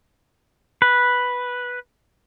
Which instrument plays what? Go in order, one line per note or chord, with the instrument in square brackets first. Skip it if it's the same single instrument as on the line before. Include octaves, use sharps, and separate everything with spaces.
[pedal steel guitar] B4